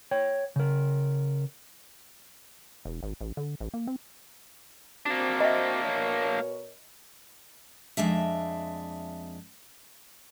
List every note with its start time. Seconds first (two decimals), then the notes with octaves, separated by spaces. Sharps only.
0.11 C#5 G5
0.56 C#3 A#4
2.85 E1
3.03 G#1
3.21 A1
3.37 D3
3.61 A1
3.74 A#3
3.87 C4
5.06 A#3 C4 D4 F#4
5.40 D#5 E5
5.84 B2 A#4 C#5
7.97 F2 G#3 D4 E5